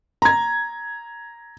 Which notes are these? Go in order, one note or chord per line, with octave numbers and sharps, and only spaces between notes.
A#5 G#6